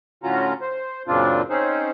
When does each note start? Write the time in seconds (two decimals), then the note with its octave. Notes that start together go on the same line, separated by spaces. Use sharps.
0.23 A2 D3 C#4 F4 F#4 A#5
0.61 C5
1.08 F#2 A#2 C#3 C4 D4 F4
1.50 C4 C#4 D#4 G#4 C5